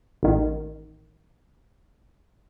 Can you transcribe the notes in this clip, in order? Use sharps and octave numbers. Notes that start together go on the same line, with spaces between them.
A1 D#3